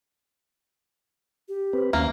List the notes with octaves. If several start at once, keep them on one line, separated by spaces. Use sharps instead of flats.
G4
C4 B4
D#2 A#3 C#4